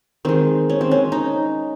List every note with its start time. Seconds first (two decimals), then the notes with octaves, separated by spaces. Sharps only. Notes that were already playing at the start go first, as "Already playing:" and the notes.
0.25 D#3 G#3 C4
0.69 C#4
0.81 C4
0.91 C#4
1.12 D#4